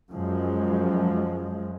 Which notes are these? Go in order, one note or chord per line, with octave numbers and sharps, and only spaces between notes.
F#2 F3 G#3